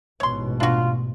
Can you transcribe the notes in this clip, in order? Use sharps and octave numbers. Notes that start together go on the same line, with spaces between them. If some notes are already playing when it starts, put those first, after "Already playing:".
A1 G#2 B2 C#5 C6
D4 F4 F#4